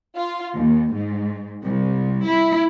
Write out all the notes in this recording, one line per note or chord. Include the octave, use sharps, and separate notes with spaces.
F4
D#2
G#2
C2
E4